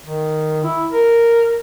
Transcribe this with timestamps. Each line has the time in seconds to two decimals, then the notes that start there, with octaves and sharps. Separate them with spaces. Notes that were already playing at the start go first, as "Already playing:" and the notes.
0.06 D#3
0.64 E4
0.93 A#4